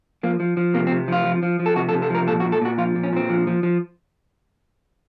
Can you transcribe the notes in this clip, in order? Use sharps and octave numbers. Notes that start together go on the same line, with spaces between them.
F3 A#3
F3
F3
C3 A#3
C4
C3
F3 F4
F3
F3
F3
A4
C3 F#4
A4
C3
A4
F3 A#4
A#2 A4
F#4
A#2
A4
A#2 F#4
F3 F4
A#2
C#4
A#2 C4
F3
F3
F3